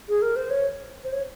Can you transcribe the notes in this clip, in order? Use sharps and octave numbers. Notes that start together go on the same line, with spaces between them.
G#4
A#4
C5
C#5
C5
C#5